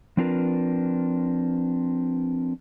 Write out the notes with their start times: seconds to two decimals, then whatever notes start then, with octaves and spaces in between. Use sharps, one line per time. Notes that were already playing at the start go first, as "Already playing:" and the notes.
0.17 F3 C4 D4 F4 A#4 B4